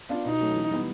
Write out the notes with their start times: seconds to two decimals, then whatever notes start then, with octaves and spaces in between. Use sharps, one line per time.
0.09 B3 D4 F4
0.25 B2 D#4
0.41 F#3 A3 C#4
0.56 E3
0.71 G3 B3